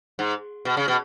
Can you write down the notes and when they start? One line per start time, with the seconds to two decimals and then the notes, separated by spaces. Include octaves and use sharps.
0.19 G#2
0.65 B2
0.77 C#3
0.88 B2